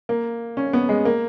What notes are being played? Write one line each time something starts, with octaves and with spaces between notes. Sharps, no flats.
A#3
C#4
B3
G#3
A#3